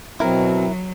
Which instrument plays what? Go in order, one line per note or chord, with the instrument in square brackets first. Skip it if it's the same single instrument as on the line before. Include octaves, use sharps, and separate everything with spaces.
[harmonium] B2 C4 [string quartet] F#3 [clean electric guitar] E4 A#4